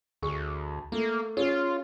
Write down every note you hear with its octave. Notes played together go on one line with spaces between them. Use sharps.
D2 G#4 C#6
A3 A#3
C#4 F4 G#4